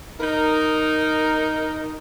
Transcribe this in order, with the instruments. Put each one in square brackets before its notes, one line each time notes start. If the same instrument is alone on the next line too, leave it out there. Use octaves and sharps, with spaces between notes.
[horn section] D#4 A#4